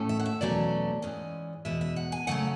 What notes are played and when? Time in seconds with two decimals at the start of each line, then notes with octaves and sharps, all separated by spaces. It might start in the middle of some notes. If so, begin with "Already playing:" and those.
Already playing: A2 A3 C#4
0.09 E5
0.20 F#5
0.26 E5
0.41 E2 B2 F#3 A3 C#4 D5
1.02 G#2 E3 G#3 C#4
1.65 E2 B2 G#3 E5
1.81 E5
1.96 F#5
2.12 G#5
2.27 C#3 F#3 A3 C#4 F#5